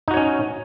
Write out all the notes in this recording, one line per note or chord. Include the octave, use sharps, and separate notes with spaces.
C#4 D#4 F#4 C#5